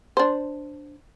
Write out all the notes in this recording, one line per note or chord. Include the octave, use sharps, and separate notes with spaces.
D4 C5